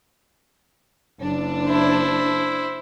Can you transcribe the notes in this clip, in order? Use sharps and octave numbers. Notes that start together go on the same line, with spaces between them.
F#1 D4
E4 C5